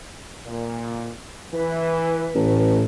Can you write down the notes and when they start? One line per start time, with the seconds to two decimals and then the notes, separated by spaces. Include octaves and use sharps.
0.46 A#2
1.52 E3 B4
2.35 A1 A2